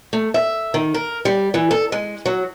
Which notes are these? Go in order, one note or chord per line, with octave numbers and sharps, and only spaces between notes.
A3
E5
D#3
A#4
G3
E3
A4
G#3
F#3